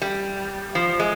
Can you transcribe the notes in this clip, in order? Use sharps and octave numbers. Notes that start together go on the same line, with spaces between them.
G3
F3
G#3